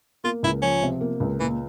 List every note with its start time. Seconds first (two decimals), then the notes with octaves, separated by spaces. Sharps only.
0.24 A#3 F4
0.43 C#2 E4
0.62 F3 C#4
0.82 C3
1.01 A#3
1.20 C#2
1.40 A#2 E3